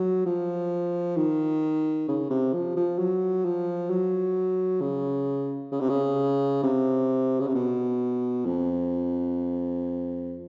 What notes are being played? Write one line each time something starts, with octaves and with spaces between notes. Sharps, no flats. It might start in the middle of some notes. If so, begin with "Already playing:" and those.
Already playing: F#3
F3
D#3
C#3
C3
F3
F3
F#3
F3
F#3
C#3
C#3
C3
C#3
C3
C#3
C3
B2
F2